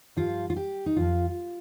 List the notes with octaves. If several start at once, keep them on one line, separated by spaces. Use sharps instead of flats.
G2 F3 F4
F4
G4
D#4
F2 F3 F4